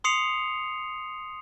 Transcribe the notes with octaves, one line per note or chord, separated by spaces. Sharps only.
C6 D#6 C7 C#7 F7